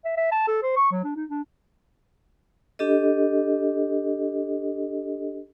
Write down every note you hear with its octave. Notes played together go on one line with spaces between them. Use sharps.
E5
E5
A5
A4
C5
C#6
F#3
D4
D#4
D4
D4 G4 A4 D#5